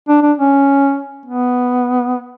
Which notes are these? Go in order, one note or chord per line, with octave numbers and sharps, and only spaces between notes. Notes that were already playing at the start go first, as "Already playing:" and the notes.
D4
D4
C#4
B3